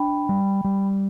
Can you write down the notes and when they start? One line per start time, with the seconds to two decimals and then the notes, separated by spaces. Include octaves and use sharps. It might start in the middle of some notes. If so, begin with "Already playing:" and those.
Already playing: D4 G5 B5
0.29 G3
0.64 G3